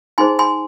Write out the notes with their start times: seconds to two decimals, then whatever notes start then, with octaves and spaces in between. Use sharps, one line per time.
0.18 D#4 G#4 C5 G#5 C6
0.39 G#5 C6